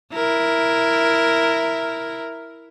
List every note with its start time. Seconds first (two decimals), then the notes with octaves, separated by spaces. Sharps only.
0.14 E4 A#4